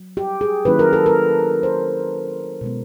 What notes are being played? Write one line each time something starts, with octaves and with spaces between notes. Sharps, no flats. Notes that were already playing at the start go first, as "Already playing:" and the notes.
Already playing: F#3
G4
G#4
D#3 F#3 A#3 C#4 E4 B4
A#4
A4
A#4
C5
B2 G#3 B3